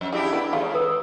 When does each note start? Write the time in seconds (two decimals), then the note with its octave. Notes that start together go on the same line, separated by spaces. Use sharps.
0.01 F2
0.13 C#3 D4 E4 G4
0.33 B3
0.53 D#2 G#3 A3 F4
0.74 B4 D#6 E6